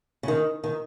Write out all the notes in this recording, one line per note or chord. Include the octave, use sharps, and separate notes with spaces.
C#3
D#3
D#3